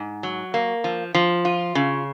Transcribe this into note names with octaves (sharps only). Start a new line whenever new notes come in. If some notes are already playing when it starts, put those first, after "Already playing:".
Already playing: G#2
F#3
A#3
F3
F3
F4
C#3